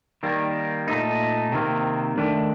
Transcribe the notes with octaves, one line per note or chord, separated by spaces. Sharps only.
D#3 G3 A#3
A#2 A3 D#4
C3 D#3 A#3
D#3 A3 D4